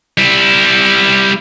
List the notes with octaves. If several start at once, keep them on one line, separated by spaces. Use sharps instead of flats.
G3 E4